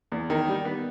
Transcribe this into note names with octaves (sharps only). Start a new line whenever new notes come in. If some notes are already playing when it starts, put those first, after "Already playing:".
E2
D#3
G3
B3